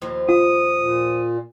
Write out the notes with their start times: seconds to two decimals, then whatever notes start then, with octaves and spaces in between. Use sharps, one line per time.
0.02 D#2 F3
0.29 F4 D#6
0.80 A#2